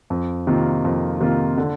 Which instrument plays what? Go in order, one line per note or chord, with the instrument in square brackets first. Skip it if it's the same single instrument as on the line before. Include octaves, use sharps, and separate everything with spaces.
[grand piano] F2
C3 D#3 A#3 F4
F2
C3 D#3 A#3 F4
D3